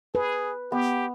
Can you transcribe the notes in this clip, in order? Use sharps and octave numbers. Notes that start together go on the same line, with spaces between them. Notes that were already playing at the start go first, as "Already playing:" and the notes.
G#4 B4
B3 G4